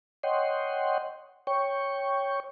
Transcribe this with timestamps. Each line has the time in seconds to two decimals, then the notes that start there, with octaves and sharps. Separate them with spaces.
0.23 C#5 D#5 F#5 G5 C6
1.47 C#5 G5 C#6